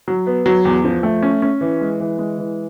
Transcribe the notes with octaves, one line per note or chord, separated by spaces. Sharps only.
F#3
B3
F#3
E2
F3
A3
C#4
C#4
E3
G#3
E3
G#3
E3